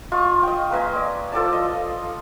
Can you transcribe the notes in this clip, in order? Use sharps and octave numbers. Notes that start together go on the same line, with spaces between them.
F4 D#5 C#6
D#5 G5
A#3 B4 D#5 G#5
D5
F3 A4 D5 A5
D#5